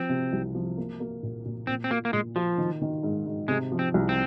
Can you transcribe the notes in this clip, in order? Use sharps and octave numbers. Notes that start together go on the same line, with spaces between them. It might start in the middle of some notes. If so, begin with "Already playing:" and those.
Already playing: F3 C4
C3
C2
F3
A#3
A#3
A#2
A#2
A#2 C4
C4
A#3 F4
A#3
A#2 G#3
F3 F4
D#3
D#3
G#2
G#2
C3 G#3
F3
C4
C2
C4